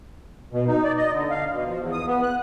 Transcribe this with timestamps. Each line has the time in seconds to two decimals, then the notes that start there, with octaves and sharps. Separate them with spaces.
0.53 B2
0.68 D#4
0.84 D5
0.97 D#5
1.13 D3
1.30 F5
1.52 B2
1.65 F3
1.80 E2
1.92 D#6
2.07 B3
2.23 F#6